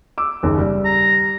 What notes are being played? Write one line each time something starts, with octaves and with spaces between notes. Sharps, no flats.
D6 E6
F#1 D#2
G3
A#5